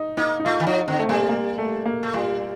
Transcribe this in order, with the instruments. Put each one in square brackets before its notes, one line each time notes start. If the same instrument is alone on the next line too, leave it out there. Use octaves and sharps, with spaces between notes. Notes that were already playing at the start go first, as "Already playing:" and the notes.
Already playing: [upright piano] D#4
[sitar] A#3 [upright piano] D#4
[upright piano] D#4
[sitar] A3 [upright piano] F4
[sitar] D#3
[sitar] F3 [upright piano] D#4
[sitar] D3 [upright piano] C4
[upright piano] A3
[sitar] G3 [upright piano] A#3
[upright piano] A#3
A3
A#3
[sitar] A3
[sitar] G3 [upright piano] F4